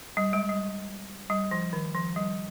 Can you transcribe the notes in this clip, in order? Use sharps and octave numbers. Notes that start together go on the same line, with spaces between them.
G3
G#3
G3
G3
F3
D#3
F3
G3